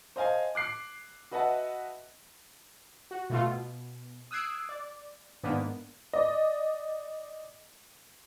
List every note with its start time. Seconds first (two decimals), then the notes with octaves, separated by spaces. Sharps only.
0.16 C5 D#5 F5 G#5 A5
0.55 D6 F#6 C7
1.31 F#4 B4 D#5 E5 F#5 A5
3.11 F#4
3.30 B2 A3 F4
3.48 B2
4.31 D#6 E6 F#6 G#6 C7 D7
4.69 D5
5.43 G#2 D#3 A#3 B3 D4
6.13 D5 D#5